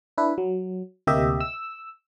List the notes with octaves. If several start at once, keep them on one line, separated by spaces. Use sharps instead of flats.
D4 E4 B4
F#3
D2 C3 A#3 G4 D#5 E5
E6